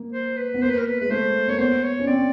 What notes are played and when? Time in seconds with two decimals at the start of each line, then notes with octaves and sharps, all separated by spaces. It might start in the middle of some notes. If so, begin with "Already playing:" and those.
Already playing: A#3
0.13 C5
0.37 B4
0.54 B3
0.62 A#3 C5
0.70 B4
0.78 A#4
0.87 B4
1.00 G#3 B4
1.10 A3 C5
1.48 A#3 C#5
1.58 B3 C5
1.83 C#5
1.99 C#4
2.07 C4 D5